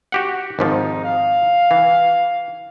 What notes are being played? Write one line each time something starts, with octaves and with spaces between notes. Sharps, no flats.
F#4 G4 F#5
G#1 G#2 F3 D#4
F5
E3